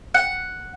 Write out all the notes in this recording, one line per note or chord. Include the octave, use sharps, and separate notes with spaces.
F#5